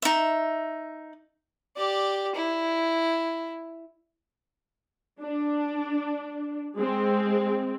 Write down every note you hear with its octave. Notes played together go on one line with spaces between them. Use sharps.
D#4 E5
G4 D5
E4
D4
G#3 C4